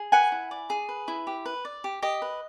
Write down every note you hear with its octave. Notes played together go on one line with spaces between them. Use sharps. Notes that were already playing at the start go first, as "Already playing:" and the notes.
Already playing: G#4
B4 F#5 G#5
E4
D5
G#4
B4
E4
G4
B4
D5
G4
G4 D#5
B4